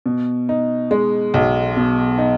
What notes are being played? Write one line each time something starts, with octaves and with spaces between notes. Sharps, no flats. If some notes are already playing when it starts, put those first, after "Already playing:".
B2
D#4
G#3
B1
B2
D#4